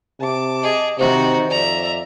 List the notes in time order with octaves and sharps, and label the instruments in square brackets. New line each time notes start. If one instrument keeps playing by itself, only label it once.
[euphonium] C3 [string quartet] A5 D6
[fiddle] G#4 [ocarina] D#5
[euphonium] C3 [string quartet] D#3 D#4 [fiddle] F#4 [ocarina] C5
[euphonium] F2 [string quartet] D5 E5 [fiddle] A#5